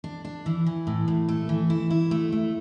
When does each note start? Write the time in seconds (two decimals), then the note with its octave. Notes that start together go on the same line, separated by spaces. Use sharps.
0.04 D4
0.25 D4
0.46 E3
0.67 E3
0.87 A2
1.08 A2
1.29 A3
1.49 E3
1.70 E4
1.90 E4
2.11 A3
2.32 A3